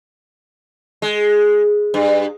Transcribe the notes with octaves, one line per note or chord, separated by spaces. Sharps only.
G#3
G2